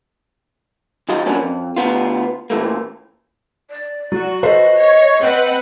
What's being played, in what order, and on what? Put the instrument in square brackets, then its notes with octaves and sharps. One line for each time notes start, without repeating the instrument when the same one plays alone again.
[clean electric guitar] D#3 F#3 F4 D#5
F3 F#3 A#3 B3 C#4 D4
F2
D2 G#2 B3 F4
A#2 E3 A3 A#3
[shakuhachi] D5
[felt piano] F#3 [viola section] F#4
[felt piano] A4 B4 C5 [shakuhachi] D#5
[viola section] C#5
C4 B4 F#5